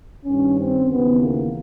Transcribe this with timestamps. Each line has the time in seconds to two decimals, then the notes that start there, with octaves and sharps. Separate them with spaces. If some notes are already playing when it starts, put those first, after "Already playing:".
0.24 G2 D#3 C#4
0.57 C4
0.89 D#2 C#3 E3 B3
1.21 A#3